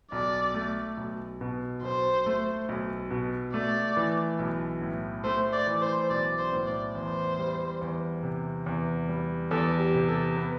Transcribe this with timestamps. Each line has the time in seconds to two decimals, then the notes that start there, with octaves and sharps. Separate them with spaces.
0.12 B1 D5
0.54 A3
0.97 B1
1.41 B2
1.82 B1 C5
2.26 A3
2.69 B1
3.10 B2
3.53 A3 D5
3.97 E3
4.39 B1
4.81 A2
5.24 A3 C5
5.53 D5
5.67 E3
5.82 C5
6.10 B1 D5
6.39 C5
6.53 A2
6.67 D5
6.95 E2 C5
7.39 G3
7.81 E2
8.23 C3
8.66 E2
9.08 G3
9.51 E2 A4
9.80 G4
9.94 C3
10.09 A4
10.37 B3